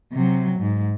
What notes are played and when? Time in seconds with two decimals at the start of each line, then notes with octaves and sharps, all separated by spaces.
0.13 C3 F#3
0.59 G#2